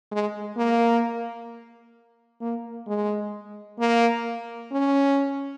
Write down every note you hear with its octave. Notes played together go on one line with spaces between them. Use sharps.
G#3
A#3
A#3
G#3
A#3
C#4